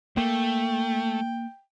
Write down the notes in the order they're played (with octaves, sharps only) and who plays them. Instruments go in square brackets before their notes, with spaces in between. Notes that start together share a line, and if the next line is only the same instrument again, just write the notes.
[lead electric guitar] A3 [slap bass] A#3 [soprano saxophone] G5